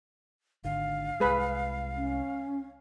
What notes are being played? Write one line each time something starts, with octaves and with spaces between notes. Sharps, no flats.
G#1 D3 F5
C2 G#3 G#4 B4 B5
C#4